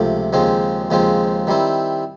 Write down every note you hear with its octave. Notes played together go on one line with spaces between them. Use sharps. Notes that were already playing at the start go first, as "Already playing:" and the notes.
Already playing: C#2 C3 F3 A3
D#2 C#3 F3 G#3 C4
D#2 C#3 F3 G#3 C4
D#3 G3 C4 E4